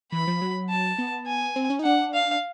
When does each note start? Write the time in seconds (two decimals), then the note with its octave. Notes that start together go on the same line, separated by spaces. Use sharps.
0.12 E3 B5
0.27 F3
0.42 F#3
0.70 A5
0.98 B3
1.27 G#5
1.56 C4
1.70 C#4
1.79 D#4
1.84 D4 F#5
2.14 F5